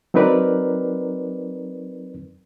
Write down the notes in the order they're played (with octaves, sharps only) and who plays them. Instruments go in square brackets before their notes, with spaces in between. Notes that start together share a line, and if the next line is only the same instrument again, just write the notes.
[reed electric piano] F#3 C4 D#4 A#4 B4 D5